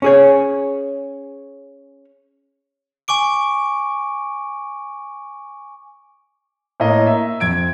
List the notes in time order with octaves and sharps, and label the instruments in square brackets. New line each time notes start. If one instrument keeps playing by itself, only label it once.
[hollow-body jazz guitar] C#4 G#4 C#5
[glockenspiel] G#5 C#6 D6 D7
[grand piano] A2 A#3 C#5 D#5 A#5
E5
F2 G#6 D7